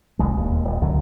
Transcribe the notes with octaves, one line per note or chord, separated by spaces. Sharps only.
F1 C2 G#3
E1 D#2
D#1
C#2 F#2 D3 F#3